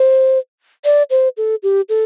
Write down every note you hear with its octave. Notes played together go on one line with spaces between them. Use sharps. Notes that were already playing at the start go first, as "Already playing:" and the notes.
Already playing: C5
D5
C5
A4
G4
A4